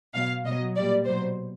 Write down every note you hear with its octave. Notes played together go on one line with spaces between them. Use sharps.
B2 F#3 F5
B2 F#3 D#5
A#2 G3 D5
B2 F#3 C5